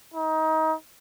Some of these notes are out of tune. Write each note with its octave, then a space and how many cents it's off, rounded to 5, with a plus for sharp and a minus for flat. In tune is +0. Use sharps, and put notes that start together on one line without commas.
D#4 +25